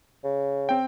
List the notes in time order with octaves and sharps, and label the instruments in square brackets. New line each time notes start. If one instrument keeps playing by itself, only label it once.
[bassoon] C#3
[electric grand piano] C4 G5